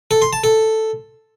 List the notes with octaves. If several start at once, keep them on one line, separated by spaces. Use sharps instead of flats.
A4
C6
A5
A4